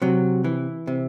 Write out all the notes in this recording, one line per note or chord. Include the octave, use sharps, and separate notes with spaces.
C3 F#3
E3
C3